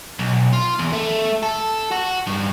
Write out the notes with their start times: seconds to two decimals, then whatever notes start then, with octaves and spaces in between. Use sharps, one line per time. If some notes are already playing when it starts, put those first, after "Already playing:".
0.19 B1
0.53 F4
0.79 E2
0.93 A3
1.43 A4
1.91 F#4
2.27 G2